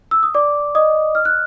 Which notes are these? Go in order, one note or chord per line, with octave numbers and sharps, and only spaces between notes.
E6
D#6
D5 D6
D#5 D#6
F6
F#6